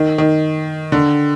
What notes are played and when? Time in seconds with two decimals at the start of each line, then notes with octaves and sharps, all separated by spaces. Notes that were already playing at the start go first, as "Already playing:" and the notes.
Already playing: D#3
0.18 D#3
0.92 D3